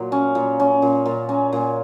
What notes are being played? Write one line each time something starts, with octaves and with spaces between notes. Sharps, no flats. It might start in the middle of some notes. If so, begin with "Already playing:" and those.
Already playing: A#2 F#3
C#4
A#2
C#4
A#2
A#2
C#4
A#2